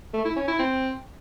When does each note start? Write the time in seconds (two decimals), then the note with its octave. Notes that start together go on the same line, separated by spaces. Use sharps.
0.13 A3
0.25 E4
0.36 C#4
0.47 E4
0.59 C4